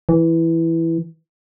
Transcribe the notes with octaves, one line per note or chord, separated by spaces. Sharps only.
E3